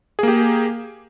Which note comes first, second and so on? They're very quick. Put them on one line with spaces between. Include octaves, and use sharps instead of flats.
G#4 A#3 G4